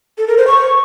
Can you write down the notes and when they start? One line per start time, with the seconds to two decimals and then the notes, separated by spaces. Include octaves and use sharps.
0.18 A4
0.28 A#4
0.37 C5
0.47 C#6